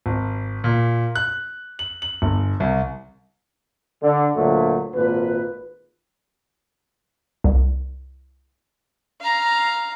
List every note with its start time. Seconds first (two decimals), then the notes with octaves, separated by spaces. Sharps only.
0.06 G#1
0.64 A#2
1.15 F#6
1.79 F#7
2.02 F#7
2.22 G1
2.60 C2
4.02 D3
4.36 D2 A#2 F#3 A3
4.95 G#1 A#2 B4
7.44 C2
9.21 F5 A#5